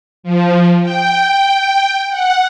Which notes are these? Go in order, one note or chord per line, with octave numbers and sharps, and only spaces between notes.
F3
G5
F#5